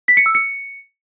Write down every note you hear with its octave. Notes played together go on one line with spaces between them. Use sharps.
B6
C#7
E6
C#7